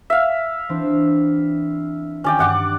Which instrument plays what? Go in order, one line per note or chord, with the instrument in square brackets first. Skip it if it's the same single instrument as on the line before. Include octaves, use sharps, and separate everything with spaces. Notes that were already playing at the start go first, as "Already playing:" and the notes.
[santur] E5 F5
[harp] E3 C4 D4
[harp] D#3 F#4 [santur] C#4 D5 G5
[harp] G2 [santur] D5 F#5 D6